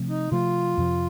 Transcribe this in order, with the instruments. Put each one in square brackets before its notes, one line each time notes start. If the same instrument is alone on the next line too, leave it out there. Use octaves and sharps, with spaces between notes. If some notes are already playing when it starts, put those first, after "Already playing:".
Already playing: [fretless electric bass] C3 F3 A3 C4
[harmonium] D#4
[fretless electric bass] C3 F3 A3 [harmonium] F4
[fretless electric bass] F2 C3 F3